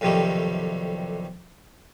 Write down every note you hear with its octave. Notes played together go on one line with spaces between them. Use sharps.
B1 F2 C3 D#3 G3 A3